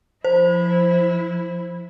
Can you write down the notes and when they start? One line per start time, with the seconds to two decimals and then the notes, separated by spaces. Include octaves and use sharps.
0.24 F3 E4 C5